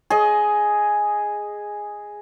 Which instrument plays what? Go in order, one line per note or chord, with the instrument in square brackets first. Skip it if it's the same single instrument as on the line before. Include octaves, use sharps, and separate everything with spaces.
[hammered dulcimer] G#4 D#5